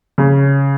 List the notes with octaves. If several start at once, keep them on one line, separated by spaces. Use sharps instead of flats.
C#3